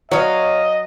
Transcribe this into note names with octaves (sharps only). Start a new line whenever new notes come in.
F#3 C#5 D#5 F5